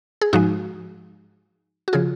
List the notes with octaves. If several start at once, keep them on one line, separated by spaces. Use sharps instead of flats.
G#4
G#2 F3 G#3 D#4 F#4
F#4
C#3 F3 F4 G#4